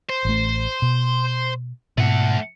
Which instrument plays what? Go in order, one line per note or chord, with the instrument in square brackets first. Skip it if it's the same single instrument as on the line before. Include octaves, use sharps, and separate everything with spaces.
[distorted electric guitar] C5
[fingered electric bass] A1 A3
B2
[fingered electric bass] G#2 B2 [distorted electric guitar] A3 F#5